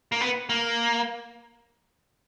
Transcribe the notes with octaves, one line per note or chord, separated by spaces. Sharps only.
A#3
B3
A#3